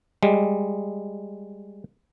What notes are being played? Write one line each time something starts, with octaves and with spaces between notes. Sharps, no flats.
G3 G#3